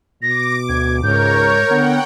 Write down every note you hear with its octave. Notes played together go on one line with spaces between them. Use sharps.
B2 D6 A#6
D2 G#6
C#2 G#2 A#4 C#5 G6
D3 B3 F#5 G5